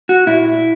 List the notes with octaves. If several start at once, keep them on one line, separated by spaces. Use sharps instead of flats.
F#4
A#2 E4